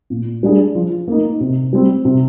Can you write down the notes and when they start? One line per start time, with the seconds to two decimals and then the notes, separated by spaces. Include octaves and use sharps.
0.10 A#2
0.43 G3 D4 G#4
0.75 F3
1.08 A#3 D#4
1.40 C3
1.73 G3 C4
2.05 C3